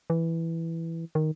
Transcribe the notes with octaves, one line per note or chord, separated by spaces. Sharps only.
E3
D#3